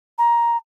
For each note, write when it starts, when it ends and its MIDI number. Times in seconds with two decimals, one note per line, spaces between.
0.18 0.57 82